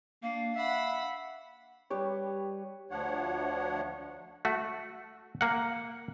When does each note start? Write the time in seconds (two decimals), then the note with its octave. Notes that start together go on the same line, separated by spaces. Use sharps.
0.23 A#3 D4 F5
0.55 E5 F#5 B5
1.90 G3 G4 B4 C#5
2.91 D2 F3 D4 C#5 F#5
4.45 A3 F#4
5.41 A#3 F#5